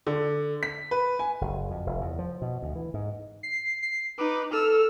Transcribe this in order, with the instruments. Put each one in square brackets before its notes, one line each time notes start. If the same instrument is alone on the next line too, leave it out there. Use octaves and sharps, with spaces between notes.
[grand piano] D3
B6
B4
G#5
[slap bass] F#1
F2
F1
E2
F3
B2
D2
E3
G#2
[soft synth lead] C7
C7
[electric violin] D#4 B4 [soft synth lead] D6
[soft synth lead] A4 [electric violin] E6 F6